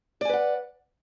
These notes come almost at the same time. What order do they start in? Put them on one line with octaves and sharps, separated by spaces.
D5 G#5 B4 F#5